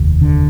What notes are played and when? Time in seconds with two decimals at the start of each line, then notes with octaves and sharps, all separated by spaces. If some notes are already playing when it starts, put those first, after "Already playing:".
Already playing: F1 D#2
0.21 D3